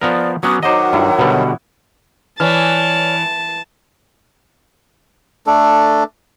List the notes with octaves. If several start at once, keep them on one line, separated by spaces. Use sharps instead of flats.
F3 B3 A#4 D5
F#3 B3 C#4 D4 F#4 D#6
D#3 F#3 C5 D#5 F#5 A#5 D6
G2 E4
B2 D3 G3 B3
E3 C#5 D5 A5 F6
A3 D4 A4